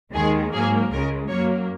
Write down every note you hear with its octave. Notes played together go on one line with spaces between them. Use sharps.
D#2 D#3 G#3 G#4
G#2 F#3 A#3 G#4
C#2 C#3 G#3 A#4
F#2 F#3 A#3 C#5